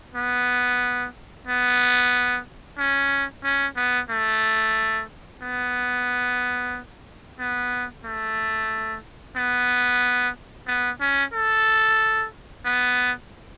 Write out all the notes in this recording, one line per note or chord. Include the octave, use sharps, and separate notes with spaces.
B3
B3
C#4
C#4
B3
A3
B3
B3
A3
B3
B3
C#4
A4
B3